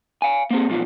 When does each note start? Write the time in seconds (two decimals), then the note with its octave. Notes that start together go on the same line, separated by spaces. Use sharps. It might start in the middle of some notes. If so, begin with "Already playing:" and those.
0.22 F5 G#5
0.51 A#3 C4 G#4
0.69 B1 F2 B2 F4